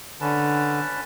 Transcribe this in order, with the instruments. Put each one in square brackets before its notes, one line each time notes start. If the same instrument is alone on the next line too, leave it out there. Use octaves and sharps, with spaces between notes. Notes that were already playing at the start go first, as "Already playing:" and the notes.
[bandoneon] D3 [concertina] C#4 B4 A5